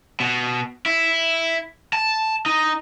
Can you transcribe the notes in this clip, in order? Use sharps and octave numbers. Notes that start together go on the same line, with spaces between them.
B2
E4
A5
D#4